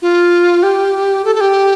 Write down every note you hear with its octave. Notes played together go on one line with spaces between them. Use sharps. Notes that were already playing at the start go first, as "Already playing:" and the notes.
F4
G4
A4
A4
G4